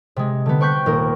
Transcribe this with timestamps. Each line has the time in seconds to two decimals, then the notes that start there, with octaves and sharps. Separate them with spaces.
0.16 C3 G#3
0.46 D3 G3 B3
0.60 C5 G5 C#6 F#6 G6 B6
0.86 D#1 A#3 A#4